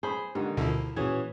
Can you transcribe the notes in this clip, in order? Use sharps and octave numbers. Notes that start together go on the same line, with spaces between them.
G#4 C5 B5
G#2 D3 D#3 D#4 G4
D2 B2 D3 F3 A#3 E4
A#2 E3 C#4 F#4 G#4 G#6